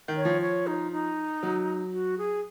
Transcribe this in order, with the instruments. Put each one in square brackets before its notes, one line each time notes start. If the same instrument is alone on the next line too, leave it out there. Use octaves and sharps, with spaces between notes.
[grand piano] D#3
[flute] C#5
[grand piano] F3
[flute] C#5
D#4
D#4
[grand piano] F#3
[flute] F#4
G#4